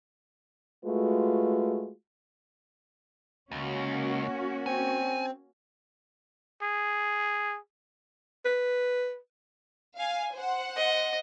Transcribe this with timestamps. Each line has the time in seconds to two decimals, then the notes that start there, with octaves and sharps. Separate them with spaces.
0.84 G#3 A3 F4 F#4 B4
3.52 C#2 A#3 C#4 F#4
4.66 C4 G#5
6.62 G#4
8.45 B4
9.96 F5 G#5
10.35 C5 F#5
10.77 D#5